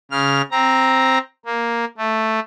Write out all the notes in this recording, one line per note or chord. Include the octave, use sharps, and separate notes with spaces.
C#3 F6
C4 A#5
A#3
A3